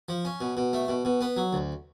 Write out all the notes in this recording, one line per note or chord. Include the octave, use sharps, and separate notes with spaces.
F3
C#4
B2
B2
A3
B2
B2
B3
F#3
D2